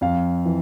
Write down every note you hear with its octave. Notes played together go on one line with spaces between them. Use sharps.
F2 F5
E3